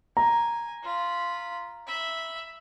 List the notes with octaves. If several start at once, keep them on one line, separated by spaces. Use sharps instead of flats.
G#5 A#5
F4 B5
E5 B5